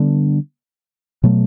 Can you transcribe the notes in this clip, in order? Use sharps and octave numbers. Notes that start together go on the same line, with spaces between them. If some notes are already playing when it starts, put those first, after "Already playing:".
Already playing: D3 G3 B3 D4
B2 F#3 A3